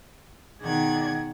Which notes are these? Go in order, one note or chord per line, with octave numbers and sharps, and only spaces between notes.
B2 D#3 G#4 D5 F#5 G#6